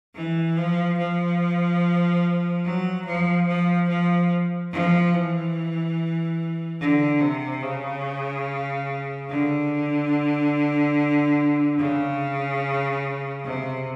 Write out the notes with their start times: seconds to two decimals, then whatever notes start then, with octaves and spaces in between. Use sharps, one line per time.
0.15 E3
0.57 F3
0.98 F3
2.64 F#3
3.05 F3
3.48 F3
3.89 F3
4.72 F3
5.13 E3
6.80 D3
7.21 C3
7.63 C#3
9.29 D3
11.78 C#3
13.44 C3